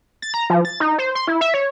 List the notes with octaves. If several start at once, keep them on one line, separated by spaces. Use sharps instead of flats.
A6
A#5
F3
A6
D#4
C5
C6
E4
E5
C#5